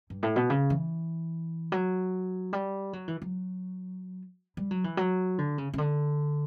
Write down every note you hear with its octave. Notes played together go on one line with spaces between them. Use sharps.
G2
A2
B2
C#3
E3
F#3
G3
F#3
E3
F#3
G3
F#3
E3
F#3
D3
C#3
C#3
D3